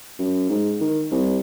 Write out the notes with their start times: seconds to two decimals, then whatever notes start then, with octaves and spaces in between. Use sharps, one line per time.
0.19 F#2
0.49 G#2
0.80 D#3
1.11 C2